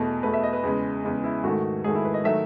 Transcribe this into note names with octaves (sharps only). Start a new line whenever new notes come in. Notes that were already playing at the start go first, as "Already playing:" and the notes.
Already playing: E2 B2 A3
E2 B2 A3 B4
E5
D#5
B4
E2 C#3 G#3
E2 C#3 G#3
E4
G#2 D#3 A3 F#4
G#2 D#3 A3 G#4
E4
B4
D#5
D#3 F#3 A3 E5